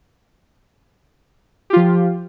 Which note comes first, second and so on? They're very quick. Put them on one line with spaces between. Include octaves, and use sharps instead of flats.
G4 F4 F3